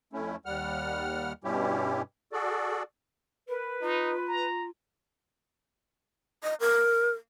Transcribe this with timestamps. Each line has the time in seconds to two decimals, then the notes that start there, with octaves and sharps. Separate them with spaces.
0.13 F2 A3 C#4 E4
0.46 D#2 G3 F#5 F6
1.44 G2 B2 G3 C#4 E4 G4
2.32 F#4 G#4 A4 D5
3.49 A#4 B4
3.82 D#4 F4
4.28 A#5
6.43 D#5
6.61 A#4